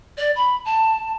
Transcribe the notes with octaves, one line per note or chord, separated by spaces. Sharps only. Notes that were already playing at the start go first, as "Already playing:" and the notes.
D5
B5
A5